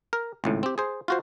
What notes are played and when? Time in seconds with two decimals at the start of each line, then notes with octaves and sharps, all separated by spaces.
0.13 A#4
0.44 G#1 C#2 A2
0.63 C4 G4
0.78 G#4 C5
1.08 F4 F#4 C5